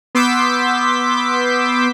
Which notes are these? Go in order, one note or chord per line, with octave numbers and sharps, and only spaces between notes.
B3 C6 D6 E6 G6 B6